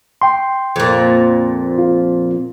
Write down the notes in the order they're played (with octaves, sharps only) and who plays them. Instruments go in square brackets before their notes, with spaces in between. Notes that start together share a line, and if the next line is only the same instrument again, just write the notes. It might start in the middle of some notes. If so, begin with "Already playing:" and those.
[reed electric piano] G5 C6
[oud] F2 A#2
[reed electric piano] F4